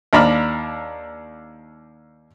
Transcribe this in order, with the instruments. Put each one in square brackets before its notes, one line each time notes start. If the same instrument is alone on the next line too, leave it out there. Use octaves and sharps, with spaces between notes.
[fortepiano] D#2 D4 A#5 B5 D6 F6